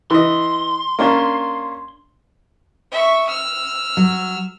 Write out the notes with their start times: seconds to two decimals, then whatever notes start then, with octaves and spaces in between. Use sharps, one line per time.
0.11 E3 D#5 C6
0.99 A#3 C#4 D4
2.92 E5 C#6
3.28 E6 F6
3.97 F#3